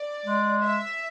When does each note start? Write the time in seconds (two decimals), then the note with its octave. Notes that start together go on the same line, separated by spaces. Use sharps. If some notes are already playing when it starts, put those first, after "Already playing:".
Already playing: D5
0.26 G#3
0.63 E5